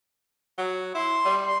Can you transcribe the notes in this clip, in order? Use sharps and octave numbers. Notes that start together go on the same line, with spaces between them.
F#3
E4 C6
G3
C6